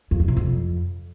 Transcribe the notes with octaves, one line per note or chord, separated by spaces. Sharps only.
F2
G2
C3
F2